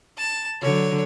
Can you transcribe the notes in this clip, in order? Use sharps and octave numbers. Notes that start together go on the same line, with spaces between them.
A5
D3 F#3 C#5